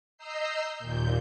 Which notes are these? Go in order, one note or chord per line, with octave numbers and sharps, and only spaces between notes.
D#5 A#5 E6 G6 C7
D#2 A#2 G6